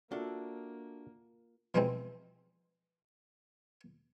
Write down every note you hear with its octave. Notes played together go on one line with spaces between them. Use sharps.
A#3 D4 F4 F#4 A4 E5
B2 E3 F3 G3 G#3 C4